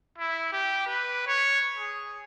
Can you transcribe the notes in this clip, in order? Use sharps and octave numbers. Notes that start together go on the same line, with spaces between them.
E4
G4
B4
C#5
G#4